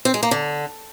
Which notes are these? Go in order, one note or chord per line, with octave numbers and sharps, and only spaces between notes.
C4
G#3
A#3
D3